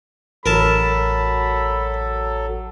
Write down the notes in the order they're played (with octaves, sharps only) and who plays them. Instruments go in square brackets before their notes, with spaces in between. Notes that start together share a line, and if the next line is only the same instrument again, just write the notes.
[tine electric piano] A1 [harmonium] F#3 A4 [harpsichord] A#4 A5 [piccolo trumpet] B5